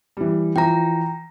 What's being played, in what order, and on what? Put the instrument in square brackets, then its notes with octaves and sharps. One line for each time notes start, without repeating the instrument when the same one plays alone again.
[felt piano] E3 G3
[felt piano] E3 F3 A#6 [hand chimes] G5 A#5